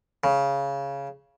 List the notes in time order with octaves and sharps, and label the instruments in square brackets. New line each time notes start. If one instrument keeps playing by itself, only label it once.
[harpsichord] C#3